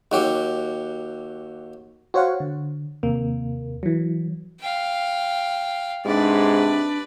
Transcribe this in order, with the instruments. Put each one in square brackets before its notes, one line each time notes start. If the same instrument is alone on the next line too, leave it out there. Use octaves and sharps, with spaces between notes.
[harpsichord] D#2 F#3 G4
[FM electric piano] F#4 C5 C#5 F5 F#5
D3
D#2 C3 A#3
E3 F#3
[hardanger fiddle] F5 G5
[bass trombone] G#2 [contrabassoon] C3 [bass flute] D4 [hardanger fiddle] B4 D5